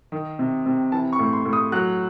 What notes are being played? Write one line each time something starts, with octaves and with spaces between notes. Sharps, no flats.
D#3
C3
C3
E3 A5
C#6
A2
C6
A2
D#6
F#3 F#6